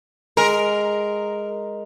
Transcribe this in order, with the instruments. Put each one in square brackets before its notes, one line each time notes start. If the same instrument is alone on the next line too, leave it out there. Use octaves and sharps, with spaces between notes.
[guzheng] G#3 [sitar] A#4